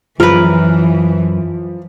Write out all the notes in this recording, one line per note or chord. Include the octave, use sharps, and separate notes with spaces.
F#2 E3 F3 A#4 B4